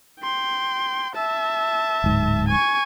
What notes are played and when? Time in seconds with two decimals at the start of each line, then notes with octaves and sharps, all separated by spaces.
0.20 G5 C6
1.15 E5 A5
2.04 D1 G#2
2.49 G#5 C#6